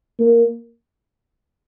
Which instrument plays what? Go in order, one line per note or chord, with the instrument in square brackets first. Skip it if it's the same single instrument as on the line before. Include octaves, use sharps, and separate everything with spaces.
[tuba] A#3